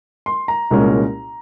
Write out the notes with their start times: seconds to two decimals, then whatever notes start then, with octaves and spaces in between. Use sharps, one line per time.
0.26 C6
0.48 A#5
0.71 C2 A#2 G#3 C#4